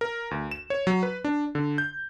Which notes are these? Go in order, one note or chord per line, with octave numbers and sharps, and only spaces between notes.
A#4
D2
E7
C#5
F#3
B4
D4
D3
G6